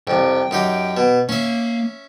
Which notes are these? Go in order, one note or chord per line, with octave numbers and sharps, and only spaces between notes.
C2 F2 G5
F#2 D#4 G4
B2
A#3 C#4 E5